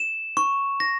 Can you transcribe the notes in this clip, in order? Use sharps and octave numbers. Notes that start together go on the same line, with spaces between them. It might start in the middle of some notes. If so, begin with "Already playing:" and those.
Already playing: E7
C#6
A#6